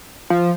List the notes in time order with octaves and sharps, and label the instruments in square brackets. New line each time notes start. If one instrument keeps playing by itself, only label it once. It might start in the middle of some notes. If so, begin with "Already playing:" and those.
[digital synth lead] F3